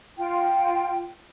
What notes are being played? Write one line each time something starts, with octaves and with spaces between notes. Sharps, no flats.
F4 G5